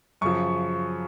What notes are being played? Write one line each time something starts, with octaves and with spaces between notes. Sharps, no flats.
F#2 C#3 F3 C#6